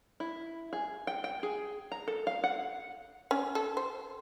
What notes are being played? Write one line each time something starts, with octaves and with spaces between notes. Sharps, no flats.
E4
G#4
G5
G5
G#4
A#5
A4
F5
F#5
C#4
A4
C5